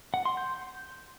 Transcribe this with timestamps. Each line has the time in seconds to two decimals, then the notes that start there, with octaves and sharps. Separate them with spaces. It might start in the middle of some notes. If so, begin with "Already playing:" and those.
0.14 F#5
0.25 C6
0.37 G6